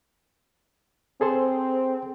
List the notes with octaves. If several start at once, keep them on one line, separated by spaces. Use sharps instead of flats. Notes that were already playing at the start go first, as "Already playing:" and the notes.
C4 G#4 A4 C5